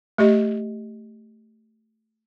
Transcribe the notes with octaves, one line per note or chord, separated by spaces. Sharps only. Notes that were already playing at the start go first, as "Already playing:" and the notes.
A3 G4 D#5